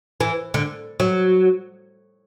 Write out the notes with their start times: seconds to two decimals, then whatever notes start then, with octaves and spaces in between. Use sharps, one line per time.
0.20 E3
0.54 D3
1.00 F#3